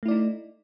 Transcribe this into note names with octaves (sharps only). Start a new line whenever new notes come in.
A3 D#4 E4 D5